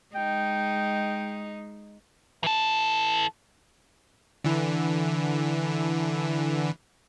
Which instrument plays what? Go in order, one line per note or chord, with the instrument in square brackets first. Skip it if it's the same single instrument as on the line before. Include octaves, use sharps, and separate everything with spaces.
[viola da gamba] G#3 D#4 [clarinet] G5
[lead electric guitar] E3 A4
[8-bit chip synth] D3 E3